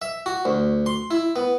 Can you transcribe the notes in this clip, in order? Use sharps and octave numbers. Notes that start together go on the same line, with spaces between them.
E5
F#4
D2
C6
E4
B3